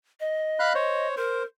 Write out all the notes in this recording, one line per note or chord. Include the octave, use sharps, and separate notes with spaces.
D#5
F5 B5 F#6
C5 C#5
A#4 C5